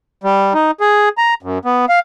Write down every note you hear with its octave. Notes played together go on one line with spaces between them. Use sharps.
G3
D#4
G#4
A#5
F#2
B3
F5